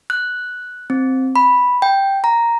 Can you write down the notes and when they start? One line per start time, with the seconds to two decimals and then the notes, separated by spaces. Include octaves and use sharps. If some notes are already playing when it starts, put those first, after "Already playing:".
0.10 F#6
0.90 C4
1.36 B5
1.82 G5
2.24 A#5